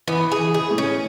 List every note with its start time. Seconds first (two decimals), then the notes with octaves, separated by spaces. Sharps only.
0.07 E3 B3
0.32 G#4
0.39 E3
0.54 G#4
0.71 A2
0.78 C#4